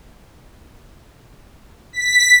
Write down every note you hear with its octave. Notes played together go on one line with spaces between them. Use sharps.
B6